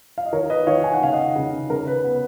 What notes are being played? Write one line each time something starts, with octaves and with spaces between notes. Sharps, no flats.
F5
D#5
D#3 A#4 C#5
B4 D#5
D#3 C#5 F5
G#5
F#5
C#3 F5
D#5 F#5
C#3
C#3 A#4
B4
B3